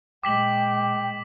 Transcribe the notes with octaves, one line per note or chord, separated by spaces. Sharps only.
A#2 G#3 G5 D6 B6 F#7